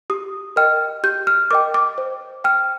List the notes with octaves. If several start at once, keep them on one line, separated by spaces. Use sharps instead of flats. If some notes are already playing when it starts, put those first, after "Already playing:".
G4 D#6
A#4 D#5 G5 F6
G4 G6
F6
A#4 D#5 G5 D6
D6
C5
G5 F6